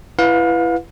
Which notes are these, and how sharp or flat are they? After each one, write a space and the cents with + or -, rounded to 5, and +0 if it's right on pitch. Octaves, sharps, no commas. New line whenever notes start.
E4 +25 B4 +0 F5 +35